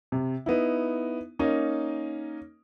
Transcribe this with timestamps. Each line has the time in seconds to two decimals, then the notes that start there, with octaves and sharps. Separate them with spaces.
0.12 C3
0.46 B3 D#4 E4
1.39 A#3 C#4 D#4